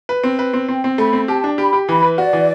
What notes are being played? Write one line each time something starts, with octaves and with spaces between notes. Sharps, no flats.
B4
C4
B4
C4
C4 G5
C4
A3 B5
C4
G4 A5
D4
G4 B5
G4
E3 B5
B4
F#4 D5
E3